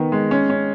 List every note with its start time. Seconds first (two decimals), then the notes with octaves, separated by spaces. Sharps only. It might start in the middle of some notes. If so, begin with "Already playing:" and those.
Already playing: D#3 B3
0.12 G#3
0.31 C#4
0.50 C#4